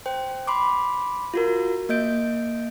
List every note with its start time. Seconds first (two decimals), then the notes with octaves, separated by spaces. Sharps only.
0.06 C5 G5
0.47 B5 C6 D6
1.34 F4 F#4 A#4
1.89 A#3 D#5 G6 D7